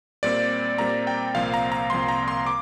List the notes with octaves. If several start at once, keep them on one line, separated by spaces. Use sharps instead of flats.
A#2 G3 C4 D5
A#2 G3 C4 A#5
G5
C2 A#2 F3 C4 F5
A#5
A#5
C2 A#2 F3 C4 C6
A#5
C6
D6